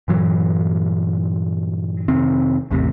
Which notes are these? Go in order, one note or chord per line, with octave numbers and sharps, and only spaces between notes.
G2 A#2 E3 F#3
F2 C3 D#3 C4
A1 E2 A2 C3